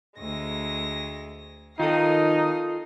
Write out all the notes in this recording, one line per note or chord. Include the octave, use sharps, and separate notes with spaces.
D2 G#3 A#6
D#3 D#4 F4 A4 F5 D#6